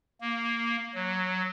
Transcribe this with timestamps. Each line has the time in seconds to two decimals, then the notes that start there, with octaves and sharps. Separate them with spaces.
0.21 A#3
0.95 F#3